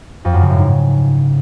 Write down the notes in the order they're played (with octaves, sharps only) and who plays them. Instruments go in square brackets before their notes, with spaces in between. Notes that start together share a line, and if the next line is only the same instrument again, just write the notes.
[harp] F2
F#2
C#3
A2
G#2